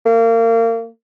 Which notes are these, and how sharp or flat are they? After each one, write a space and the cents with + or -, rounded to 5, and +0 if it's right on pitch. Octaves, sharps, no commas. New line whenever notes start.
A#3 -30